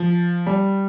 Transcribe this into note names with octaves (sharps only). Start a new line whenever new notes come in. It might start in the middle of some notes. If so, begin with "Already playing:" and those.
Already playing: F3
G3